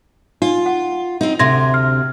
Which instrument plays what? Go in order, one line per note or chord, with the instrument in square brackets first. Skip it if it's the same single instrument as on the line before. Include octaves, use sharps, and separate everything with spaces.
[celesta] D#4 [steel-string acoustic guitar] F4
[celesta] F#5
[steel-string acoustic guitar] C4 D#4
[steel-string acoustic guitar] D2 C3 [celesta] C6 G#6 A#6
[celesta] F6